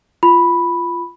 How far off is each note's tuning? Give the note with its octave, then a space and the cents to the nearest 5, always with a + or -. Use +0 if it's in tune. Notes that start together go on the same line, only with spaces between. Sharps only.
F4 -15 B5 +0